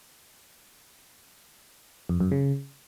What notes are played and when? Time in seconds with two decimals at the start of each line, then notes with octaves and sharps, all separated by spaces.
2.09 F2
2.20 F#2
2.31 C#3